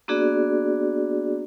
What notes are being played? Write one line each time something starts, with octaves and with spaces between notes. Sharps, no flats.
A#3 B3 D4 F#4 G#4 D5